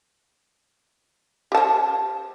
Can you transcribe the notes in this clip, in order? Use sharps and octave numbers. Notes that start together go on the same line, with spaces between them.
G4 C5 A5